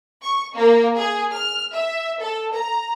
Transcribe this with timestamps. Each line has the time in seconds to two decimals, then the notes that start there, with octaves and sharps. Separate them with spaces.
0.23 C#6
0.55 A#3
0.97 G#4
1.32 F6
1.73 E5
2.19 A4
2.55 A#5